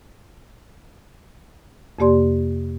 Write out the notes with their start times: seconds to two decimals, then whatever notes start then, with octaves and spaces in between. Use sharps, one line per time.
1.99 F2 C3 A#3 G4 D5 C6